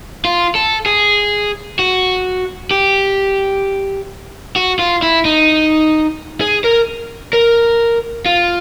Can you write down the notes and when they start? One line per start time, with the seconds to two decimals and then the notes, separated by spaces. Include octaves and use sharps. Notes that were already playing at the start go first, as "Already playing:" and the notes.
0.25 F4
0.55 A4
0.86 G#4
1.79 F#4
2.71 G4
4.56 F#4
4.79 F4
5.03 E4
5.25 D#4
6.41 G#4
6.64 A#4
7.33 A#4
8.26 F4